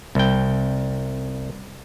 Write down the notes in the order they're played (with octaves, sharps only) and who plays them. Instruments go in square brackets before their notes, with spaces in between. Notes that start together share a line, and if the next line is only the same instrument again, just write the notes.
[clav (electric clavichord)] C2 G5